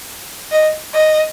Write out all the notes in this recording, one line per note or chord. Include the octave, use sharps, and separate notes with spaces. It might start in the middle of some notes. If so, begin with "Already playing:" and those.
D#5
D#5